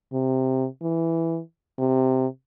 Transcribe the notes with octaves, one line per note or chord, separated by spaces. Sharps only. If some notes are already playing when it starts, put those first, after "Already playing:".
C3
E3
C3